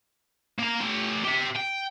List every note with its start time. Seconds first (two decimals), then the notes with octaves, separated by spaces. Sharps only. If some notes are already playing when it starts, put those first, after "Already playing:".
0.59 A#3 A#5
0.80 A3 G4
1.24 G4 E5
1.55 G5